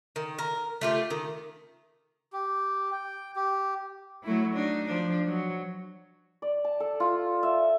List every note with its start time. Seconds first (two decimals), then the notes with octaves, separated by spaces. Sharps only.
0.16 D#3
0.39 A#4
0.81 A3 F4 G4
1.10 D#3
2.33 G4
2.92 G5
3.36 G4
4.23 F#3 A3 E4
4.54 D4 D#4
4.87 F3 D4
5.27 F#3
6.42 D5
6.65 A5
6.80 A4
7.00 F4
7.43 E5